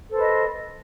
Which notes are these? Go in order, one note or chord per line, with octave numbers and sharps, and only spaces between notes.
A4 B4 C5 D#5